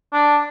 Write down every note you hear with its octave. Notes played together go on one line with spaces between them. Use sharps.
D4